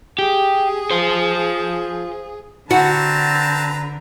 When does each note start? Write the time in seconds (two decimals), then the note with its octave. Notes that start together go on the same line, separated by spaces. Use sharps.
0.19 G4 G#4
0.91 F4 C5
2.71 D3 C4 F#4 B4 A5 A#5